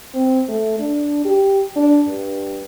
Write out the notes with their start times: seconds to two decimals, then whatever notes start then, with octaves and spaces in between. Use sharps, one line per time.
0.14 C4
0.48 A3
0.79 D4
1.25 G4
1.76 D4
2.08 G2